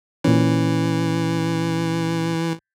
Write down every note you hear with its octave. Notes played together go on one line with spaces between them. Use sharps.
A#2 E3 C#4